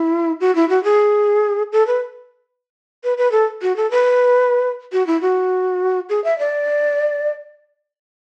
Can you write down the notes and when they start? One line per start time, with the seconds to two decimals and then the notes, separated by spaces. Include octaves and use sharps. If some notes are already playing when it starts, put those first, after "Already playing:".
Already playing: E4
0.40 F#4
0.55 E4
0.69 F#4
0.84 G#4
1.72 A4
1.87 B4
3.04 B4
3.18 B4
3.32 A4
3.62 F#4
3.76 A4
3.91 B4
4.93 F#4
5.07 E4
5.21 F#4
6.09 G#4
6.24 E5
6.39 D5